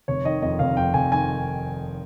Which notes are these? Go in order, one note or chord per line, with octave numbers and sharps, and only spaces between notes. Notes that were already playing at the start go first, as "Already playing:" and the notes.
F1 C#5
D#3 D#5
F2 D#5
F1 F5
F2 G5
F1 G#5
D#3 G#5